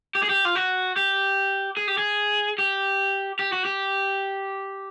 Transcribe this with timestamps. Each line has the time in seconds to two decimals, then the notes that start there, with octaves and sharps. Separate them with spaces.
0.15 G4
0.23 G#4
0.29 G4
0.45 F4
0.55 F#4
0.96 G4
1.77 G#4
1.88 G4
1.98 G#4
2.58 G4
3.39 G4
3.53 F#4
3.65 G4